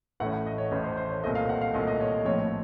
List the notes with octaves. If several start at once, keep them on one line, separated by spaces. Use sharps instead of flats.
A1 A2 A3 C#4 F#5
F#5
D#5
C#5
A1 A2 A3 C#4 C#5
C5
C5
C#5
C2 A#2 A3 D#5
F5
F#5
F5
C2 A#2 A3 D#5
D#5
C#5
C#5
A#1 A2 F3 A3 C4 C#5